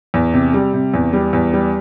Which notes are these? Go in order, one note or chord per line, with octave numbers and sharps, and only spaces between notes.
E2
C3
G3
C3
E2
G3
E2
G3